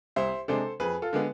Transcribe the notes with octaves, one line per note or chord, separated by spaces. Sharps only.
C2 C5 E5
C3 G#3 D4 A4 C5
F2 G#4 B4
F4 A4
D3 G#3 B3